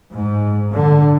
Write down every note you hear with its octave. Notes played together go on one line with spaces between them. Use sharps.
G#2
D3